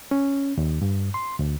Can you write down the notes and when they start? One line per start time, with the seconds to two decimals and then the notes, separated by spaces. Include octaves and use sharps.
0.11 C#4
0.57 D#2
0.82 G2
1.14 C6
1.39 D2